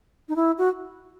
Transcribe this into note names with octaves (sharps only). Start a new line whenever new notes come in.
D#4
E4
F#4